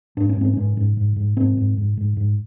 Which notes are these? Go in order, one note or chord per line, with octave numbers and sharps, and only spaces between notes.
G#2 D4
C#4
G#2 C4
G#2 C#4
G#2
G#2
G#2
G#2 C4
G#2
G#2
G#2
G#2